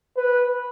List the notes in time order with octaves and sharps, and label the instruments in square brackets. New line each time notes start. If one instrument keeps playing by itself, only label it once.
[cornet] B4